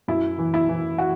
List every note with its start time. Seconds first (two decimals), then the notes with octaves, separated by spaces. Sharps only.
0.08 F#2 E4
0.38 E3
0.54 E4
0.69 E3
0.98 F#4